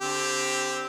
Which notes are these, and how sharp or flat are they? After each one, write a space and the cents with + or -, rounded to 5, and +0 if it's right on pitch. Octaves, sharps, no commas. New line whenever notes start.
D3 -25 C4 +0 G4 +5